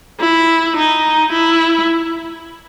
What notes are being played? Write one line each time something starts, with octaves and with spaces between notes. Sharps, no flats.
E4
D#4
E4